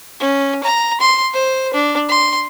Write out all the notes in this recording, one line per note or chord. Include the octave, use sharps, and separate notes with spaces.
C#4
A#5
C6
C5
D4
C6